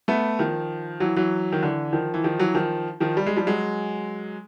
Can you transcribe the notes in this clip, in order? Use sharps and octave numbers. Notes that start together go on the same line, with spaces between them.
A3 B3
D#3 F3
E3 F#3
E3 F#3
D#3
D3 E3
D#3 F3
E3
D#3 F3
E3 F#3
D#3 F3
D#3 F3
G3
G#3
F3 G3
F#3 G#3